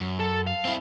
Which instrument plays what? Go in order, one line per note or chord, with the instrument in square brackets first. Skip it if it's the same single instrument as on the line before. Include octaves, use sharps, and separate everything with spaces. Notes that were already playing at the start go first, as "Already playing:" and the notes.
[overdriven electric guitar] F#2
[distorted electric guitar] A4
F5
[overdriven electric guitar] C4 E4